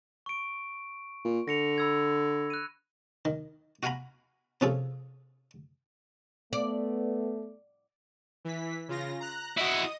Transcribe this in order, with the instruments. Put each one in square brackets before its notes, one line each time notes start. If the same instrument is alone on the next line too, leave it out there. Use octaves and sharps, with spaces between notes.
[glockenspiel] C#6 D7
[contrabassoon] A#2
[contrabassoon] D3 [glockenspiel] A#6 C#7 F7
[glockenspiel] B5 E6 G#6
F#6 D#7
[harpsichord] D#3
F#4 F5 F#5 G#5 A#5 B5
C3 F3 C#4 F4 G#4 A4
[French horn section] A3 B3 [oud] D5
[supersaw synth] E3 B6
C#3 F4 A#6
A#5 F#6
[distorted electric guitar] E4 F#4 [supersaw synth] D#5 D#6